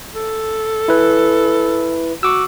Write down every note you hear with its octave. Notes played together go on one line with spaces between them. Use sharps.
A4
E4 B4
F#4 C#6 D6 E6